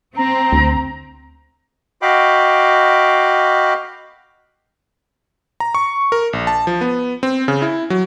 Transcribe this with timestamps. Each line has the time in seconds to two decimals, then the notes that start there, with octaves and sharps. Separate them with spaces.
0.16 C4 A#5
0.52 D2
2.02 F#4 D#5 F5 G5 B5 D6
5.60 A#5
5.75 C#6
6.12 A#4
6.33 A#1
6.47 A5
6.67 F3
6.81 B3
7.23 C4
7.48 C#3
7.62 E4
7.90 F#3